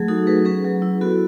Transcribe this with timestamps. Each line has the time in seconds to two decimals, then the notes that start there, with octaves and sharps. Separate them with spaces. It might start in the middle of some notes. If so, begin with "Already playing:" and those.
Already playing: F#3 A3 G#4
0.08 D#4 F#4 A4
0.27 F#3 G#4 B4
0.45 C#4 G#4 B4
0.64 F#3
0.82 E4
1.01 B3 F#4 A4